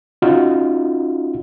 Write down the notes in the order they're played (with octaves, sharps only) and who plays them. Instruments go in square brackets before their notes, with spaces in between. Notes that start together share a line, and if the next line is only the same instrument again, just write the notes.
[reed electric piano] C#4 D#4 F4 F#4